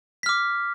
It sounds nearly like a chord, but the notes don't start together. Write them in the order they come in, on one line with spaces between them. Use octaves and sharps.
B6 F6 D6